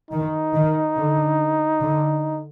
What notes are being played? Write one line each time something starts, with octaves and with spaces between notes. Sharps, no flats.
D#3 D#4
D#3
D3
D3